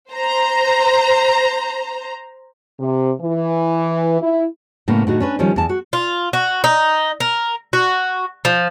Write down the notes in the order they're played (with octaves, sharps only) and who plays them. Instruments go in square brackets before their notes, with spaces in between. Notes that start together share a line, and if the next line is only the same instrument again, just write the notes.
[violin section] C5 A#5
[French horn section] C3
E3
E4
[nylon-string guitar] A2 C#3 A#3 B3
A2 D3 D#4 F#4
C#4 D4 B4
D#3 F3 G3 C#4
E2 A5
F#4
[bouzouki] F4
F#4
D#4
A#4
F#4
F3